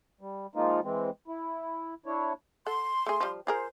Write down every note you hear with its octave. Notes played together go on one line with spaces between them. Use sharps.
G3
F3 G#3 A#3 D#4 F4
E3 G#3 C4
E4
D4 E4 C#5
A4 F#5 C6
A3 G#4
F3 G3 F4
F4 G#4 A#4 C5